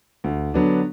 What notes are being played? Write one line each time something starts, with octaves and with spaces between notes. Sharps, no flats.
D2
D3 F#3 B3 D4